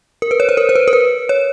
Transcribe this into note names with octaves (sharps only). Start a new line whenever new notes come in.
A#4
B4
C#5
C5
A#4
C5
B4
A#4
B4
C#5